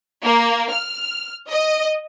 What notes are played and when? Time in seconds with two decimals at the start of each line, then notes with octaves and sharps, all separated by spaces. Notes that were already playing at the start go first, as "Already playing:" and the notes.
0.23 A#3
0.72 F6
1.50 D#5